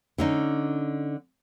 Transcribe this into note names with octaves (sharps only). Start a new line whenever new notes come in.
D3 C#4 D#4